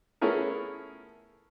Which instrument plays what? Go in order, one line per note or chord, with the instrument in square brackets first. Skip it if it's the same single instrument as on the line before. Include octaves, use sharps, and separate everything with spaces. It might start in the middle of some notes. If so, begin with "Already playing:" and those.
[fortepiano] A3 B3 C#4 E4 G#4 A#4